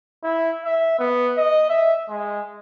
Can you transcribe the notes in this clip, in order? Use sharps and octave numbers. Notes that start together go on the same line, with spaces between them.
E4
E5
B3
D#5
E5
G#3